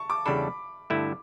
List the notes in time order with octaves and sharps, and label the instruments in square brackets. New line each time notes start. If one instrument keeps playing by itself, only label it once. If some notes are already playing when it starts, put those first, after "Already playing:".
Already playing: [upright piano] A5 C#6
D6
[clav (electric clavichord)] E2 C#3 G3 D4 A4 [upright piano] B5
[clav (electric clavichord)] G2 D3 A3 E4